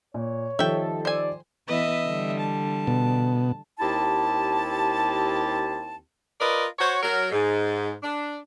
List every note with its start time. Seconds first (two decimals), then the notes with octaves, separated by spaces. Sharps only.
0.14 A#2 C#5
0.59 D#3 F3 G3 A4 E5 G5
1.05 C5 D5 G#5
1.68 E3 B3 B4 D#5 E5
2.05 D3 G3
2.40 A5
2.87 B2
3.80 D#2 C4 E4 G4 A5
6.40 F4 A#4 B4 D5 D#5
6.79 F#4 C5 C#5
7.02 F#3 A#4
7.32 G#2
8.03 D4